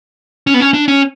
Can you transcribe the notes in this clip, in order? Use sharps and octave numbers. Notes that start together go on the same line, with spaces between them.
C#4
B3
C#4
D4
C#4